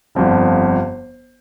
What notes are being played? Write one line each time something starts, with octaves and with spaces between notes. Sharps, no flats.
G1 F2 D3